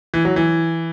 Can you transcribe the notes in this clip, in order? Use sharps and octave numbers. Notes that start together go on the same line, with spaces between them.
E3
F#3
E3